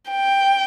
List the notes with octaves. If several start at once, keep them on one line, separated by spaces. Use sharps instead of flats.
G5